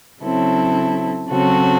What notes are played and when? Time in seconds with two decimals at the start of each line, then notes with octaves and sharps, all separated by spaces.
0.21 C#3 F#3 C4 E4 A4
1.29 C#3 F#3 C4 F#4 A4